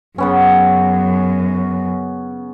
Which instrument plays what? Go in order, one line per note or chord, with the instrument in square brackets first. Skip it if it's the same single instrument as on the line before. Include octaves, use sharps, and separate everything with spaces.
[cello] F#2 [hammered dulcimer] C#3 B3 C#4